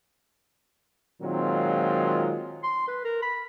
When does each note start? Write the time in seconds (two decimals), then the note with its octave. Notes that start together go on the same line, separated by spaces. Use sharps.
1.21 A#2 D#3 F#3 G#3 C4 F4
2.63 C6
2.88 B4
3.05 A#4
3.22 B5